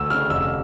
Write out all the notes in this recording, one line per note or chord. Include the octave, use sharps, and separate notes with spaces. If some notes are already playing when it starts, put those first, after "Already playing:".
Already playing: D2 E6
C#3 F6
F1 E6